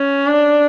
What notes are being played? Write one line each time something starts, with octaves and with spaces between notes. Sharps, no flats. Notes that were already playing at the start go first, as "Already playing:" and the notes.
Already playing: C#4
D4